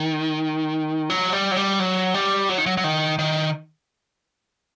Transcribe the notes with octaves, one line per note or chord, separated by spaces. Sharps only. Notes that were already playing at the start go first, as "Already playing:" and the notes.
Already playing: D#3
F#3
G3
F#3
G3
F#3
G3
F#3
D#3
F#3
F#3
D#3
D#3